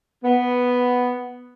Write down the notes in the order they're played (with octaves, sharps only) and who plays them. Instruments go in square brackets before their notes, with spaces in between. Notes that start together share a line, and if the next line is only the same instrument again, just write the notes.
[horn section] B3